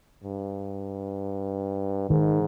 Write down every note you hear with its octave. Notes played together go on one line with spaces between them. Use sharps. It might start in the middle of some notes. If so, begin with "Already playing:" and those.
G2
G#2 D#3